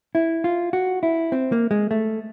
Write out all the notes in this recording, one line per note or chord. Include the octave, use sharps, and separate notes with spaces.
E4
F4
F#4
E4
C4
A#3
G#3
A3